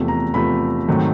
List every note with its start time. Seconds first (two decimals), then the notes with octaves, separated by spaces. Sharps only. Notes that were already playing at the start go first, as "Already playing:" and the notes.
Already playing: E2 C3 F3 A3
0.08 A#5
0.34 E2 C3 F3 A3 B5
0.88 G#2 D#3 F#3 A3 C4